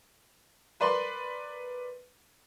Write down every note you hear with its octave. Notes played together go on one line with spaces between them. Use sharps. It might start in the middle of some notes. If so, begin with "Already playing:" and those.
A#4 B4 D5 B5 C6